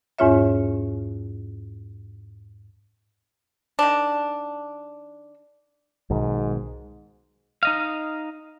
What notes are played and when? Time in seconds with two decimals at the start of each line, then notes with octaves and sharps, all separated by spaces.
0.19 E2 G#2 C#4 F4 C#5 E5
3.79 D#3 D4
6.10 B1 G#2 B2 D#3
7.63 D#4 D#5 F5